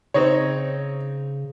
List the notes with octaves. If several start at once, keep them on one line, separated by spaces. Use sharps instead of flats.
C#3 C4 D#4 C#5